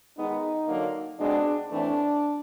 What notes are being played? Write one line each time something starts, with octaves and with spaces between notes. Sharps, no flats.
D#3 G#3 B3 D#4
D3 F#3 A#3
B2 G#3 C4 D4
A2 E3 A3 C4 D4